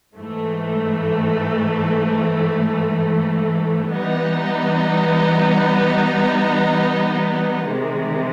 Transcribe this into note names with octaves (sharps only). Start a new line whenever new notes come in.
G#2 E3 A3
E3 G3 B3 D#4
C3 D#3 G#3